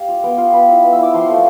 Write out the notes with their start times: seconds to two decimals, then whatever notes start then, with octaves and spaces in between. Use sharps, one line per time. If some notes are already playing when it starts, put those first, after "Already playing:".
Already playing: G4 F5
0.08 F4
0.24 B3 G5
0.38 F4
0.53 B3 B5
0.69 E4
0.84 B3
0.93 E6
0.99 E4 D6
1.14 F3 C6
1.29 A3 C4 F4